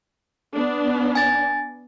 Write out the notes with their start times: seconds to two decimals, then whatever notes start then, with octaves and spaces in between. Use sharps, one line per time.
0.55 B3 D4
1.15 G#5 A6